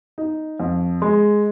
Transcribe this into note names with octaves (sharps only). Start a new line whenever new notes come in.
D#4
F2
G#3